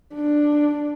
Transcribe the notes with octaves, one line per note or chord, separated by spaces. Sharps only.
D4